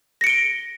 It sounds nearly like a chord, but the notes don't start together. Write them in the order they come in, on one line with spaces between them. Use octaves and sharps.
A#6 C#7 D7 G7